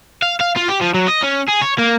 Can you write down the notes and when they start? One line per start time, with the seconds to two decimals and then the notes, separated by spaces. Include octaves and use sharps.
0.22 F5
0.40 F5
0.56 F4
0.68 G4
0.81 F3
0.94 F#3
1.08 D#5
1.23 C#4
1.49 G#4
1.62 C#5
1.79 A#3